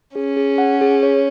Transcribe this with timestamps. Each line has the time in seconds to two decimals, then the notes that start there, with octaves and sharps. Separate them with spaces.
0.15 C#4 G#4
0.37 G#4
0.58 F#5
0.81 G#4
1.03 C#5